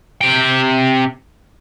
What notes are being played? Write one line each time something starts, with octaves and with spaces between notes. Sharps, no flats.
C3 G5